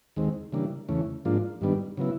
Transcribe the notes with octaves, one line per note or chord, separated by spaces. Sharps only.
D#2 D#3 G#3 C4
C#3 E3 G3 A#3 D4
E2 C#3 E3 A3 C#4
G#2 F3 A#3 D4 F4
G2 D#3 G3 B3 D4
C#3 F#3 B3 E4